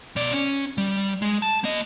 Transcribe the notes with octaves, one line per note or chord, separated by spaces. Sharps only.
B2 D5
C#4
G3
G#3
A5
A#3 D#5